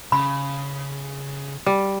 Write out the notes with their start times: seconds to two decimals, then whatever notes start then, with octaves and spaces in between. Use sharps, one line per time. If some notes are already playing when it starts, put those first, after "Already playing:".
0.12 C#3 B5
1.66 G3